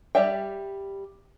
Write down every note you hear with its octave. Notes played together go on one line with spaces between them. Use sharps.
G3 G4 D5 E5 G5